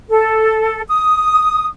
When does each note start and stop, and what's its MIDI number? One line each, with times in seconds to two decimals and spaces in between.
0.09 0.81 69
0.88 1.65 87